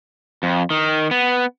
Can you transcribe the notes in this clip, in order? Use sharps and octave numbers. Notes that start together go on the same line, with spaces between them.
F2
D#3
B3